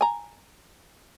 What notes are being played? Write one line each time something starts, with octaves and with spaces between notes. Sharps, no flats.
G#5 A#5